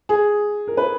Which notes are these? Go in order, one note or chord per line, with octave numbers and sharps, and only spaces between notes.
G#4
A#4
B4